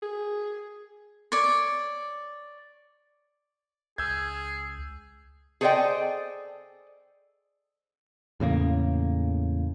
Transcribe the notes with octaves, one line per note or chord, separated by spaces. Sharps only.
G#4
C#5 D5
C#2 G#4 E6 G6 G#6
G#4 A4 C5 D5 D#5 G5
E2 A2 C#3 A#3